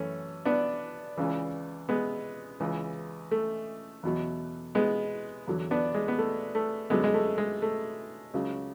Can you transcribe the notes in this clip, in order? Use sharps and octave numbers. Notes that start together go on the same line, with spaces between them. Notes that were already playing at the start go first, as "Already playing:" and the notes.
Already playing: F#2 E3 A3 C#4
B3 D4
C#2 C#3 E3
G#3 B3
C#2 C#3 E3
A3
E2 B2 F#3
G#3 B3
E2 D3 F#3
B3 D4
G#3
B3
A3
A3
F#2 D3 F#3 G#3 B3
G#3
A3
G#3
A3
C#2 C#3 F#3